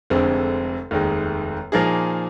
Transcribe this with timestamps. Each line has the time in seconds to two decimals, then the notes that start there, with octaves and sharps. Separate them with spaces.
0.10 F1 F2 D3 G#3 C4
0.91 F1 D#2 D#3 G#3
1.72 A#2 F3 A#3 D#4 G#4